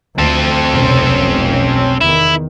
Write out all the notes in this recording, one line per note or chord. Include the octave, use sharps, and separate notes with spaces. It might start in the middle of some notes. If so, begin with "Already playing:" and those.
D2 C4 A4
F1 B1 C#4
E2 D#3 E4